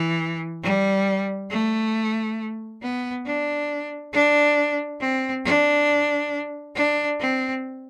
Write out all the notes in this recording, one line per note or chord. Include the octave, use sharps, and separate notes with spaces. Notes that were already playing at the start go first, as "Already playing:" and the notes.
Already playing: E3
G3
A3
B3
D4
D4
C4
D4
D4
C4